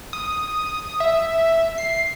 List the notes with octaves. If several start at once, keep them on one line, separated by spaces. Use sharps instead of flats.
D#6
E5
C7